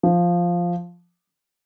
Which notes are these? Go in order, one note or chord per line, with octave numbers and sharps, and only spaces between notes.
F3